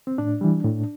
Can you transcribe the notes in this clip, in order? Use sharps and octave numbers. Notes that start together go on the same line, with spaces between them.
C4
A2 D4
E3 G3
A2